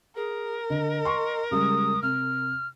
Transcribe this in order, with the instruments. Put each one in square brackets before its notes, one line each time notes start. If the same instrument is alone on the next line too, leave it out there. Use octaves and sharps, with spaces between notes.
[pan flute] G#4 [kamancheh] A#4
[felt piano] D3 [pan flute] D#5
[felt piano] C6 C#6
[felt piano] C#3 G3 G#3 [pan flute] D#6
[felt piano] C3 [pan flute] F6